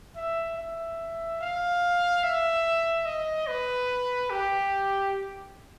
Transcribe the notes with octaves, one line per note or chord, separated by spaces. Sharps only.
E5
E5
F5
E5
D#5
B4
G4